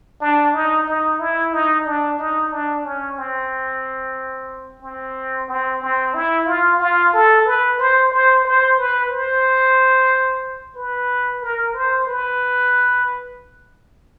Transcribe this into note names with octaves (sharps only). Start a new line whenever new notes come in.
D4
D#4
D#4
E4
D#4
D4
D#4
D4
C#4
C4
C4
C4
C4
E4
F4
F4
A4
B4
C5
C5
C5
B4
C5
B4
A#4
C5
B4